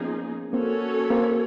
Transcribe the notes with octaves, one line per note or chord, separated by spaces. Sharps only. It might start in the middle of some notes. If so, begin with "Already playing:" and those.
Already playing: F3 A#3 B3 C#4 D#4 G#4
A#3 C4 C#4 F#4 A4 C#5
A#3 C4